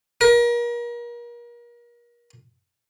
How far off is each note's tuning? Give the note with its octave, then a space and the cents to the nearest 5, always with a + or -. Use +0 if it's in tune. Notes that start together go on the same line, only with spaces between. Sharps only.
A#4 +35